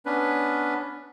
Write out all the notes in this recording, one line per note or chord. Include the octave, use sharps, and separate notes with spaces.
B3 C#4 D4 B4